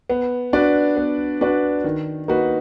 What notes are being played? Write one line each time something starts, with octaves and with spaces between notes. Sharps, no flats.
B3
D4 F#4 B4 D5
B3
D4 F#4 B4 D5
D#3
A#3 D#4 F#4 B4